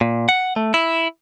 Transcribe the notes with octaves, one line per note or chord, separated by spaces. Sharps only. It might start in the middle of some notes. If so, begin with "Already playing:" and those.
A#2
F#5
A3
E4